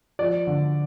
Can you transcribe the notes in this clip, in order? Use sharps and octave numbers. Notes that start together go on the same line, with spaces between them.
F3 D5
D3